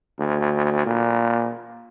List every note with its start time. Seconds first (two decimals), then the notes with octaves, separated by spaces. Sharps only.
0.19 D2
0.86 A#2